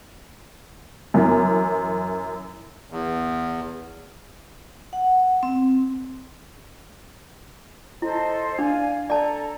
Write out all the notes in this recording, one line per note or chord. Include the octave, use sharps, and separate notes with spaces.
F#2 E3
E2
F#5
C4
E4 A4 C5 D#5
D4 D5 F5 G#5
A4 D5 A5 A#5